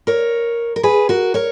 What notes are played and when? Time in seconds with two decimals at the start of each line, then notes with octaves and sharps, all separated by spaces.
0.07 A#4 C#5
0.76 A#4
0.83 G#4 B4
1.09 F#4 A#4
1.34 A#4 C#5